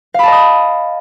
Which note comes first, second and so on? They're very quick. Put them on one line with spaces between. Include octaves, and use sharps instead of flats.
F5 B5 A5 D#5 D#6